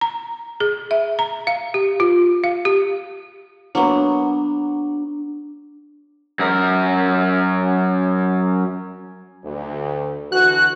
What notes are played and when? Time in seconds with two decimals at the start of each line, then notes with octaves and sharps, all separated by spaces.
0.01 A#5
0.60 G#4
0.91 E5
1.19 A#5
1.47 F5
1.74 G4
2.00 F4
2.44 F5
2.65 G4
3.75 F#3 A#3 B3 D4
6.39 F#2 A#4
9.44 D2
10.32 D3 E3 F#4 F#6